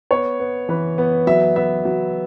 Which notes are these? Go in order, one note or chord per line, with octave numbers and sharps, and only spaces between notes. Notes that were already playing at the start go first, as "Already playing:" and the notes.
B3 C#5
B3
E3 B4
B3
F#3 E5
B3 E5
F#3